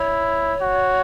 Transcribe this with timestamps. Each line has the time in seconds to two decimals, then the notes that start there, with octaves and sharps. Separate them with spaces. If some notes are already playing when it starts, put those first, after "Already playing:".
Already playing: E4 C#5
0.61 F#4